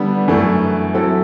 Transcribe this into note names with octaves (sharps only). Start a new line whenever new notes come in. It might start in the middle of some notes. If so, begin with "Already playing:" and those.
Already playing: D3 G3 B3 D4
F#2 E3 A3
F#3 C4 E4 A4